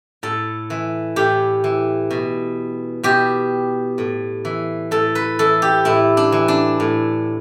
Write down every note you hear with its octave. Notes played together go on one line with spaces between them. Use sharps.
A2 A4
E3
A2 G4
E3
B2
B2 G4
A2
E3
A2 A4
B4
E3 A4
G4
A2 E4
D4
E3
D4
A2